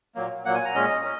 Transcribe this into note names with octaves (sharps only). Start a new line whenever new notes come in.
A#2 F#3 A#3
A#2 F#3 A#3 F#5
G#5
A#5
A#2 G#3 C#4 D#5
C#4